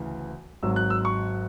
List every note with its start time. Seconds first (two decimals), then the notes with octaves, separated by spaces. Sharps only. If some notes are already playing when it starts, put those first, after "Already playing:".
Already playing: D2 C#3 E3
0.63 G#1 G#2 F#3 E6
0.76 F#6
0.90 E6
1.05 C#6